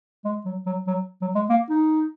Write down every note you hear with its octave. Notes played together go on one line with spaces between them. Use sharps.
G#3
F#3
F#3
F#3
F#3
G#3
A#3
D#4